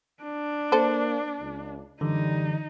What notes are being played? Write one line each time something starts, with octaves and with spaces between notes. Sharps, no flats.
D4
A#3 A4 C5
C#2
F#2 D3 E3 G3 D#4